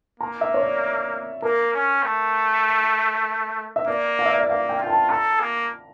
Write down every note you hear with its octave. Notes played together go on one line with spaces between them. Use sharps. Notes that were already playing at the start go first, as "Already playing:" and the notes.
A#3 A#5
E5
C#5
D5
A#3 A#4
C#4
A3
E5
A#3 D5
F5
E5
D5
E5
A#3 F5
G5
F4 G5
A5
A4 A#5
A#3